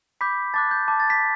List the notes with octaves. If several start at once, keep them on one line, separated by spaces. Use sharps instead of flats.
B5 D6 G6 B6
A5 D6 F#6 A6
G6
A5 D6 G6
A6
B6